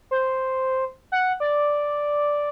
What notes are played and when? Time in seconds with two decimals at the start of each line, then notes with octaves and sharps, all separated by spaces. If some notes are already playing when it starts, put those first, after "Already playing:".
0.11 C5
1.12 F#5
1.40 D5